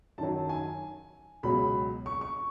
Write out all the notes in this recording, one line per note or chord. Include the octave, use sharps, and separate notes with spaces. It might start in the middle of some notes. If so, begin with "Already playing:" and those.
F#2 D#3 F#3 A5
G#5
C#2 B2 F#3 B5
C#6
C#6